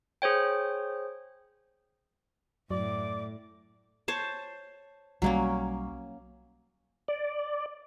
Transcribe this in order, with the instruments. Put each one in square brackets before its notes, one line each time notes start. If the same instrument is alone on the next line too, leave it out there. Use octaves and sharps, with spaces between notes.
[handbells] G#4 C5 C#5 G5
[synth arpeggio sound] F#2 F#3 [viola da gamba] A2 [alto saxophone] D5 [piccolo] D6
[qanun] C5 C#5 A5
[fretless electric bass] B1 G3 [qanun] F#3 A#3 C#4
[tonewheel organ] D5